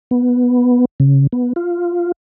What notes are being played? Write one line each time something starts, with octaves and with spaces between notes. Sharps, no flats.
B3
C#3
B3
F4